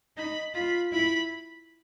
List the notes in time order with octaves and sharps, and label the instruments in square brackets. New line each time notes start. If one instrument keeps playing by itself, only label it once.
[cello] D#4 [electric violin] B5
[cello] F4 [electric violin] B5
[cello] E4 [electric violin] B5